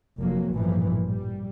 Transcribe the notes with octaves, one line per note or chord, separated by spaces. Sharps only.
F1 F2 F#3 A#3
A1 G2 A#2 E3 F3
G3